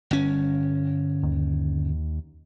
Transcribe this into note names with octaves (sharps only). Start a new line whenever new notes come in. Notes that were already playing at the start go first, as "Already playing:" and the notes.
G1 C#4
D#2